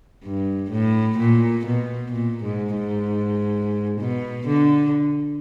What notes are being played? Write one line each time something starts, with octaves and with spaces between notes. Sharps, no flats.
G2
A2
A#2
B2
A#2
G#2
G#2
B2
D3